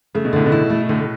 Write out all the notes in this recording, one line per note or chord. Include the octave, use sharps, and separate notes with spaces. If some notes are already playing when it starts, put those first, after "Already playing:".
C#3 A3
B2
A2 D3
B2
E4
A3
A2 D3